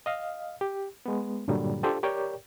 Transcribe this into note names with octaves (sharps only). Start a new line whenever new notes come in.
D#5 F5
G4
G#3 B3
G2 A#2 D3 F#3 G3
D4 F4 G4 A4 C5
G4 A#4 C#5 D5 G5